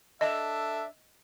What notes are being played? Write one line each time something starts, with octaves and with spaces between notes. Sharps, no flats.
D4 A4 D#5 E5